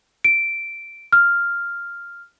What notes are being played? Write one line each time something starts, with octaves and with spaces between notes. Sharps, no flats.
D7
F6